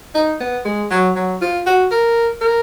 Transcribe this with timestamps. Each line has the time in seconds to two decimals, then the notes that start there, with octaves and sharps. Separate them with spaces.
0.15 D#4
0.40 B3
0.65 G#3
0.91 F#3
1.16 F#3
1.41 F4
1.66 F#4
1.91 A#4
2.41 A#4